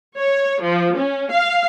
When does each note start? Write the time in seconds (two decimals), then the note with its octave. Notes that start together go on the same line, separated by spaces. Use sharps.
0.16 C#5
0.63 F3
0.95 C#4
1.31 F5